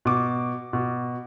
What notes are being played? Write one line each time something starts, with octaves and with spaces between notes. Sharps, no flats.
B2 D6
B2